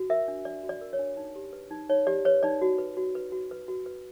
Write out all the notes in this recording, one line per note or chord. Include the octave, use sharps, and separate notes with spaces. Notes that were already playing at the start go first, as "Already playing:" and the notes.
Already playing: F#4
A#4 E5
D4
D4 D5
F#4
D5
A#4
C#5
D4
D#4
G4
B4
D#4
D#4 C#5
G4 D5
B4 C#5
D#4 D5
F#4
B4
F#4
B4
F#4
B4
F#4
B4